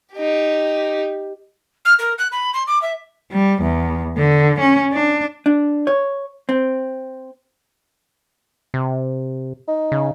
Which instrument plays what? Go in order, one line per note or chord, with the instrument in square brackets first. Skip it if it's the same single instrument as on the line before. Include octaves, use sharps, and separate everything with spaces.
[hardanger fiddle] D#4 G4
[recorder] F6
A#4
F#6
B5
C6
D6
E5
[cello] G3
E2
D3
C#4
D4
[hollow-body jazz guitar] D4
C#5
C4
[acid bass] C3
[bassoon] D#4
[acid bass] C#3